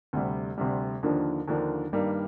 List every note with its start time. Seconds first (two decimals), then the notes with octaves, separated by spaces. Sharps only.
0.13 D2 C3 G3
0.58 D2 C3 G3
1.03 D#2 D3 F3 A#3 D4
1.48 D#2 D3 F3 A#3 D4
1.93 G2 D#3 G3 A#3